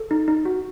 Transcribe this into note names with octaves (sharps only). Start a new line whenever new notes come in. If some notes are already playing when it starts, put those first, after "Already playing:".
Already playing: A4
D#4
D#4
F#4